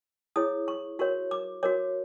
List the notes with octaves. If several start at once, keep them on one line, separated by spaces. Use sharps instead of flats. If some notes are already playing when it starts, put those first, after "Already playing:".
E4 G#4 C#5 D#6
C#6
F#4 A#4 C#5 C#6
D6
F#4 A#4 C#5 D6